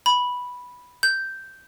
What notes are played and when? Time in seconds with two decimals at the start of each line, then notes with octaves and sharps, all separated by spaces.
0.06 B5
1.03 G6